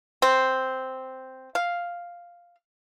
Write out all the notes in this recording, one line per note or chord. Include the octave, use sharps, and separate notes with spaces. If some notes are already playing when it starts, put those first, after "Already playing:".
C4
F5